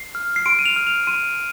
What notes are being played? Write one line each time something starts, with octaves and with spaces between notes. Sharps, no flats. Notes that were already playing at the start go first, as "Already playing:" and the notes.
Already playing: C7
F6
C7
C6 D7
D#7
F7
F6
F7
C6 D#7